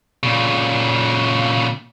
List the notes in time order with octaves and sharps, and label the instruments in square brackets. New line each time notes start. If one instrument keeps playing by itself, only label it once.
[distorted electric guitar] A#2 C#3